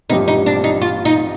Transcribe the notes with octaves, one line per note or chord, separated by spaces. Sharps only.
A1 G2 F3 C4 D#4 G4
D#4
D4
D#4
F4
D#4